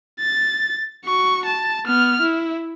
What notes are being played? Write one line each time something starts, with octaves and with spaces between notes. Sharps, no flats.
A6
F#4 C#6
A5
B3 F6
E4